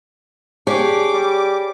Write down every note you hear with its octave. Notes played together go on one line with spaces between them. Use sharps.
D4 G4 G#4 C#5 D6
G3